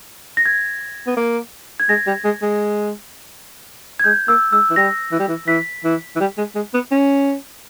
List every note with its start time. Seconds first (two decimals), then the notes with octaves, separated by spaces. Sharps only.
0.37 A#6
0.46 G#6
1.07 B3
1.17 A#3
1.80 G#6
1.89 G#3 A#6
2.07 G3
2.25 G#3
2.42 G#3
4.00 G#6
4.04 G#3 G6
4.28 A#3 E6
4.52 G#3 E6
4.70 E3
4.76 G3 A#6
5.12 E3
5.20 G3
5.28 E3
5.47 E3 B6
5.84 E3
6.16 E3
6.20 G3
6.38 G#3
6.55 G#3
6.74 B3
6.91 C#4